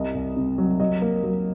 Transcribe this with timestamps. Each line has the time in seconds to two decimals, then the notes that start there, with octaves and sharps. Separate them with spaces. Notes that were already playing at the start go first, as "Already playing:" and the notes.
Already playing: C2 D#5
0.15 C2
0.36 C3
0.58 F#3
0.80 F#3 D#5
1.02 A#3
1.24 F#3